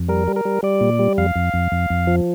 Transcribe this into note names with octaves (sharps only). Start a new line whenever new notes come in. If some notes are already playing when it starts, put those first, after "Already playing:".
Already playing: F2
G3 A#4
G3
A#4
G3
G3 D5
A#2
G3
F2 F5
F2
F2
F2
F2
F3